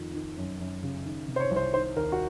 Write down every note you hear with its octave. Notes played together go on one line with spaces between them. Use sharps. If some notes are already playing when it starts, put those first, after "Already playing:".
Already playing: F2 D#3
D#3
F#2
F#2
C#3
D#3
C3
C5
C#5
C2
C5
D#3 C5
D#2 A#4
F#4